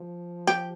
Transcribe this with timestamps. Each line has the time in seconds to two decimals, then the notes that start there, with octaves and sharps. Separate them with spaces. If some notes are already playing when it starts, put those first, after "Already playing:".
Already playing: F3
0.47 G4